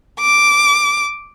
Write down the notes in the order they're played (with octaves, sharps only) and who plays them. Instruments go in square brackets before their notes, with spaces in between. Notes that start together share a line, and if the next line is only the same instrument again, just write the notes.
[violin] D6